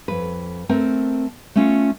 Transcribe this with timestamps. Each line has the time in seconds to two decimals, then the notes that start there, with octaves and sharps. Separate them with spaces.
0.08 F2 B4
0.69 A3 C4 A#4 G5
1.56 A3 C#4 F4